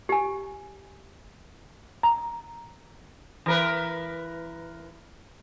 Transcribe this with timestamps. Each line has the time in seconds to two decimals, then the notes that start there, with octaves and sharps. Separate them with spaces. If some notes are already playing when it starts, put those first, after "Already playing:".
0.09 G4 G#5
2.03 A#5
3.46 E3 A#4 B4